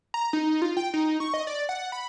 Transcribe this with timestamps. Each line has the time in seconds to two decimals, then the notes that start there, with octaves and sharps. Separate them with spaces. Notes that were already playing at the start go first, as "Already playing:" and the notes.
0.14 A#5
0.33 D#4
0.62 F4
0.77 G5
0.94 D#4
1.20 C#6
1.34 D#5
1.47 D5
1.69 F#5
1.92 B5